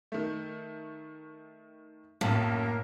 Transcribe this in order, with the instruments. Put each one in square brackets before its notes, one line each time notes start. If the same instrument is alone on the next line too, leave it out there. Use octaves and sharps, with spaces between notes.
[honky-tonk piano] D#3 A3
[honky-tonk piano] B1 F#2 [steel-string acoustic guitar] A2 [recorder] A#3